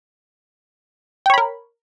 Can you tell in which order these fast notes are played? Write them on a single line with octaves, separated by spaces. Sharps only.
G5 C#5 B5 A#4